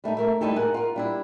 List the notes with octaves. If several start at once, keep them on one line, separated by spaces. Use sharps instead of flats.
G3 A3 B3 D#4
A3 A#4 E5
G3 A3 D#4 E4 G4 A4
G#4 A#4 F#5
F4 A#4
G3 D4 E4